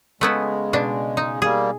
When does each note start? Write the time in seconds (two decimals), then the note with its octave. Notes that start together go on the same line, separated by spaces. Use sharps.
0.21 C#3 G#3 A3 B3 E4
0.73 B2 D4
1.17 D#4
1.42 G3 A#3 G#4